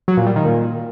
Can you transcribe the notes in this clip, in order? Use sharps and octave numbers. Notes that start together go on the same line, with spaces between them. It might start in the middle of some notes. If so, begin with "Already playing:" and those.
F#3
A#2
G3
D#3
A#2